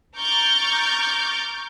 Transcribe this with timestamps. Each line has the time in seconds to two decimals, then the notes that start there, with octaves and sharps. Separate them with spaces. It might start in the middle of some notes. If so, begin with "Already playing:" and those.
0.16 A#5 C#6 D6 F6 G6 A6